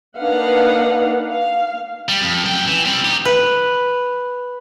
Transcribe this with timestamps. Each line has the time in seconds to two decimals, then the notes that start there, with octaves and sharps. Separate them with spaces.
0.17 A#3 D4 D#4 B4 F5 F#5
1.31 F5
2.09 G3
2.21 F2
2.44 F#2 G5
2.67 E3
2.85 G3 C4
3.05 D#4 G4
3.25 B4